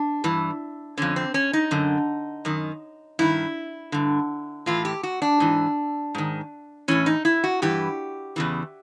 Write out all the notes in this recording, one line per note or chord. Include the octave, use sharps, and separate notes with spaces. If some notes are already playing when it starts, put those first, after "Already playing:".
Already playing: D4
G2 E3
F2 D3 C#4
C4
C#4
D#4
F#2 D3
F#2 D#3
G2 D#3 E4
G2 D3
A2 E3 F4
G4
F#4
D4
G#2 E3
G#2 D#3
A2 E3 C#4
D#4
E4
F#4
G2 E3 G4
E2 C#3 E3